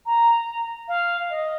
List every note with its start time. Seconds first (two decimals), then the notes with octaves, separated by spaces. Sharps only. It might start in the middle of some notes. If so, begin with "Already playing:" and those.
0.06 A#5
0.88 F5
1.30 D#5